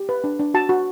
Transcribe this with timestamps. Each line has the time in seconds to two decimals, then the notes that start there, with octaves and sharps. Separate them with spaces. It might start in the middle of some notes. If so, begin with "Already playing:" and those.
Already playing: G4
0.09 B4
0.24 D4
0.40 D4
0.54 F#4 A5
0.69 F#4